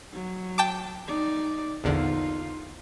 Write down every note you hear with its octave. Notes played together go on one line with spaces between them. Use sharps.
F#3
G5 A5 D6
D#4 D5
A#1 E2 D3 D#4 F4